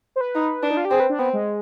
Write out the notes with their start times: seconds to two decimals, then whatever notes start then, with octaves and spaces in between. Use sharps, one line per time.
0.16 C5
0.21 B4
0.35 D#4
0.63 D4
0.71 D#4
0.77 F4
0.85 G4
0.91 C4 G#4
1.00 B4
1.10 D4
1.19 B3 C4
1.33 G#3